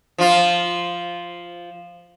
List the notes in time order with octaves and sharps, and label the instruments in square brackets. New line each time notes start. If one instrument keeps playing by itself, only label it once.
[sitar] F3 F4